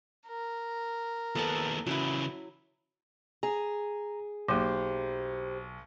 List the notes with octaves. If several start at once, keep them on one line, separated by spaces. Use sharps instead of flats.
A#4
D#2 B3 A4 F#5 A5
C#3 E3 F#3 E4
G#4 A#5
B1 F#3 A#3 G4 C5